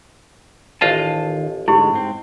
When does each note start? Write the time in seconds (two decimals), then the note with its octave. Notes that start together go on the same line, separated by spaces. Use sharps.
0.81 A1 D#3 F4 D#5 F5 A5
1.68 G#2 D3 G#3 E4 G4
1.94 G#2 C4